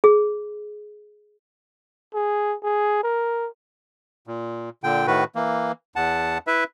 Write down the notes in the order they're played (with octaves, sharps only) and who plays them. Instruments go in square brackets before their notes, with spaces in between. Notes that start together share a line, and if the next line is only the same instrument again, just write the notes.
[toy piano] G#4
[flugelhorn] G#4
G#4
A#4
[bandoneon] A#2
A#2 D3 G5
A2 D#3 F#4 B4
E3 A#3
E2 F#5 A5
E4 B4 E5